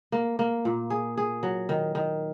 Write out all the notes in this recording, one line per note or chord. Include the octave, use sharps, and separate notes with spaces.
A#3
A#3
A#2
G#4
G#4
F#3
D#3
D#3